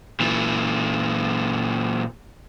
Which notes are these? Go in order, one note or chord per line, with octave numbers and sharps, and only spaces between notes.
A#2 E3